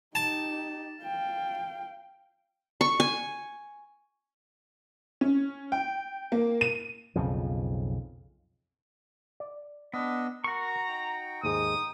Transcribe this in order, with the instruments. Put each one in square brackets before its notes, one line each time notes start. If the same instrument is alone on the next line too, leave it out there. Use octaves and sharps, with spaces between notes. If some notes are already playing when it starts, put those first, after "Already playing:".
[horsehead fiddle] D#4 G4 [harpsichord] A5
[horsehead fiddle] F5 G5
[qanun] C#6
G#5
[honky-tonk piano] C#4
G5
A#3
D#7
[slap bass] B1 F2 C#3 F3
[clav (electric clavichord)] D5
[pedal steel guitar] B3 [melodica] D4 D#5 E6
[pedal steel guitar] F#4 C#6 [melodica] A#4 [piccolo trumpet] A#5
[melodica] D#4 G5
[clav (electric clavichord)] D#2 G#2 G#3 [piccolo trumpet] D#6